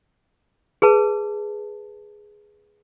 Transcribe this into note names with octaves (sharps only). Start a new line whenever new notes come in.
G#4 B4 A5